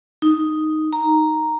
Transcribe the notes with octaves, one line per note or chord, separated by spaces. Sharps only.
D#4
A#5